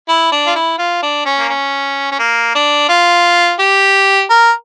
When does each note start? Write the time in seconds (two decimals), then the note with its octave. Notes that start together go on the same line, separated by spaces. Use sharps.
0.09 E4
0.32 D4
0.47 F4
0.55 E4
0.78 F4
1.02 D4
1.25 C#4
1.39 A#3
1.49 C#4
2.11 C#4
2.19 A#3
2.55 D4
2.89 F4
3.60 G4
4.30 A#4